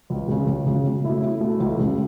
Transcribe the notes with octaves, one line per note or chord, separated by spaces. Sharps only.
C#2
C#3 G#3
C#2
C#3 G#3
B2
A3 E4
B2
A3 E4
C#2
C#3 G#3 C#4